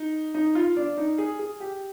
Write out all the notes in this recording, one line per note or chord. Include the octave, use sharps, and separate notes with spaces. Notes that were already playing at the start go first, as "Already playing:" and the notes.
Already playing: D#4
D#4
F4
D4
D#4
G#4
G#4
G4